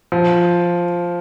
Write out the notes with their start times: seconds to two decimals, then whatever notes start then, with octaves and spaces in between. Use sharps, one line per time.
0.12 F3